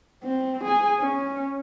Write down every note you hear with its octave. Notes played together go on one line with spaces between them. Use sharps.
C4
G#4 G#5
C#4